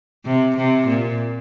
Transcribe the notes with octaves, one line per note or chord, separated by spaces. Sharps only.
C3
C3
A#2